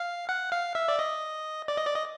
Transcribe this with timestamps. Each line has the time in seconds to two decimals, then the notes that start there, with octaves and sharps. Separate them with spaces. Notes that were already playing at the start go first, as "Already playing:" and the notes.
Already playing: F5
0.29 F#5
0.52 F5
0.75 E5
0.88 D5
0.99 D#5
1.68 D5
1.77 D#5
1.86 D5
1.95 D#5